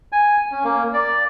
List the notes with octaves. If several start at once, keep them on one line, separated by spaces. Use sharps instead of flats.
G#5
C#4
A#3
D5